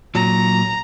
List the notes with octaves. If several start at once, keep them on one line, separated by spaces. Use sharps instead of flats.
A#2 F#3 A#5